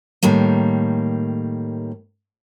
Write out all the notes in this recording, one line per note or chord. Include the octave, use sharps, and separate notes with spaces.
A2 D#3 G3 A#3